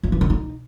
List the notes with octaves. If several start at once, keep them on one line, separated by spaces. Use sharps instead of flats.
F3
E3
D3
D#4